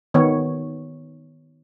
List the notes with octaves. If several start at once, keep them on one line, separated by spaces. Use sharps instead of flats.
D#3 B3 C#5